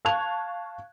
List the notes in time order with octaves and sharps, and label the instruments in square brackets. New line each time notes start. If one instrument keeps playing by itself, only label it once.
[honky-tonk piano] F5 A5 C#6 F#6 G#6 F7